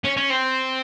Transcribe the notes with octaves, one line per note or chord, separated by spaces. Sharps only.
C#4
C#4
C4